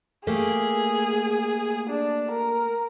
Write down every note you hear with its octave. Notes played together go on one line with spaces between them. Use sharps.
A3 A#3 G4 G#4
D4
A#4